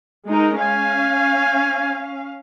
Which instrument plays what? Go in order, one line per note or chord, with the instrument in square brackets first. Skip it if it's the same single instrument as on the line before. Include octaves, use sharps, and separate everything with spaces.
[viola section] G#3 D#4 A#4
[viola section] C#4 F5 [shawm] G#5